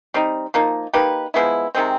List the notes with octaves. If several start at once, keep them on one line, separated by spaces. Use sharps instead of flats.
G3 C4 D#4
F3 A#3 D#4
A#3 D#4 G4 B4
F3 G#3 B3 E4
C3 D#3 G#3 C4